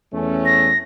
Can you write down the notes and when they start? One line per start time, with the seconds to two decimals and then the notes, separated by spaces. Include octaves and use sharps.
0.13 E2 A3 C#4
0.46 A#6